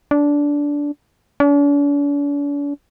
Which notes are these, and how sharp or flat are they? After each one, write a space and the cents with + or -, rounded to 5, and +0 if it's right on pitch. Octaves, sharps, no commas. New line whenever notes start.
D4 -15
D4 -45